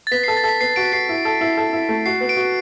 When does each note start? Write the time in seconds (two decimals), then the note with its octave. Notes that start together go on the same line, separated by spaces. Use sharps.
0.07 A6
0.11 B3 B6
0.24 C7
0.28 A4
0.37 A6
0.44 A4 B6
0.61 B3 C7
0.76 F#4 D7
0.93 F#4 C7
1.09 E4
1.25 A4
1.41 E4
1.57 A4
1.73 E4
1.89 A3
2.06 F#4 C7
2.21 B3
2.29 D7
2.37 F#4